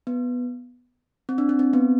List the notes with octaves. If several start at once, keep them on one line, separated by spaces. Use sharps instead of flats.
B3
C4
D4
C4
C4
B3